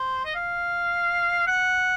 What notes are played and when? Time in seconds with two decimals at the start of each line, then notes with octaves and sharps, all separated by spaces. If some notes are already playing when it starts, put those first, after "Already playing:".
Already playing: C5
0.25 D#5
0.35 F5
1.47 F#5